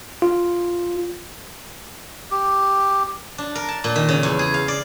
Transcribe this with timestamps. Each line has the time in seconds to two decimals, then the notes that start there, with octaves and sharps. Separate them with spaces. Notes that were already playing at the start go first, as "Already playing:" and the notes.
0.22 F4
2.31 G4
3.38 D4
3.55 A#4
3.69 A5
3.84 A#2
3.95 D#3
4.08 C#3
4.23 E2
4.39 G#4
4.54 F5
4.68 D5